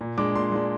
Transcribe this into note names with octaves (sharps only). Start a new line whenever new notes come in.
A#2
G#3 D4 D6
A#2 C6
G#3 D4